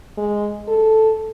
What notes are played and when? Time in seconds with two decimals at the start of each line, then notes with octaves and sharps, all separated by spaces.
0.17 G#3
0.68 A4